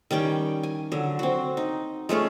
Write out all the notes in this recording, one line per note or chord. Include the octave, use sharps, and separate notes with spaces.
D#3 G3 C#4 G5
G#5
D3 F#3
C4 F#4
D#4
G#3 A3 C#4 F4